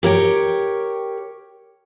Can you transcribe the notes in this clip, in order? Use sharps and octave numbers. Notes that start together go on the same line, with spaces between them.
G4 A#4 C#5 G5